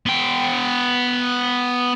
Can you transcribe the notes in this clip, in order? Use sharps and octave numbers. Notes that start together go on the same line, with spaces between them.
B3 G5